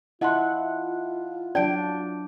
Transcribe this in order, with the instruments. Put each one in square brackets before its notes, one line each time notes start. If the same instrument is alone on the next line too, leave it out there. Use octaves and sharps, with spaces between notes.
[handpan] E4 F#5 [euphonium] F4 [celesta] D#5 A5 C6
[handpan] F#3 D4 [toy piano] D5 [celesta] A5 G6 D7